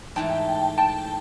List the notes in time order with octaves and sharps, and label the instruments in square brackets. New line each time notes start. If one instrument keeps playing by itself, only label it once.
[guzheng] G#2 E3 A3 [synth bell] G5 A5
[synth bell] G5 A5